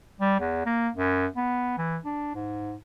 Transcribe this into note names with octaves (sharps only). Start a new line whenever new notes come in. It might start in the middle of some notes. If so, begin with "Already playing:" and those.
G3
E2
A#3
F#2
B3
E3
D4
G#2